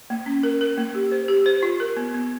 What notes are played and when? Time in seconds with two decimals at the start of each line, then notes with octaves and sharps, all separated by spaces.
0.10 A#3
0.26 C#4
0.43 A#4
0.61 A#4
0.77 A#3
0.95 G4
1.12 C5
1.28 G4
1.46 C5
1.63 F4
1.80 A#4
1.97 B3
2.14 B3